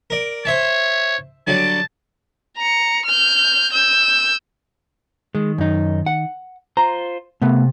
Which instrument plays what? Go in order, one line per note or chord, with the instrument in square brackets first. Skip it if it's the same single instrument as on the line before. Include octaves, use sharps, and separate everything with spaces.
[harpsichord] A#4 D5
[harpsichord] C5 E5 A5 [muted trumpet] C#5
[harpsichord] D3 F#3 G3 [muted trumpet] A5
[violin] A#5 C#7
F6 G6
E6 G6
[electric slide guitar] D#3 [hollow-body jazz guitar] G#3
[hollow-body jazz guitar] F#2 D#4
F#5
[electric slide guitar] F4 C5 [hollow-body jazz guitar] A#5
[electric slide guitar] C3 [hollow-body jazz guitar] A3 B3